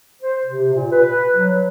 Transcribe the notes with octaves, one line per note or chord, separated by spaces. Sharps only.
C5
C3
A#2
B4
F#3